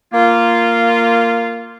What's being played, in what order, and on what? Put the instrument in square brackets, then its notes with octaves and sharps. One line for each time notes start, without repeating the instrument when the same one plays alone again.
[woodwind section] A#3 F4